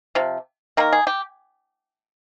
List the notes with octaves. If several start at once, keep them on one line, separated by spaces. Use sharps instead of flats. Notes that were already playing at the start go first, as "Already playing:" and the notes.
C3 F3
D#3 A#3 A#4
G#4
G4